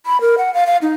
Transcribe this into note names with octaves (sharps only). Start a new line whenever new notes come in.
B5
A#4
F#5
F5
F5
D#4